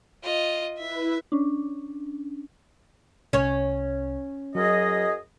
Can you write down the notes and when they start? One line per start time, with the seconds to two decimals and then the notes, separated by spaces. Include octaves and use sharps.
0.23 F4 D#5
0.78 E4 B4 E5
1.32 C#4 D4
3.33 C2 C#4 C#5
4.55 F#2 F#3 G#4 D#5